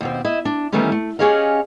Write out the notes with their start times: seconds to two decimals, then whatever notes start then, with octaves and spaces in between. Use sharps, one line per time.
0.01 D#2 B2 C4
0.25 E4 D#5
0.45 D4
0.72 D#3 E3 G3 A3 B3 C#4
0.92 A3
1.19 C#4 G4 G#4 C#5 D#5 F5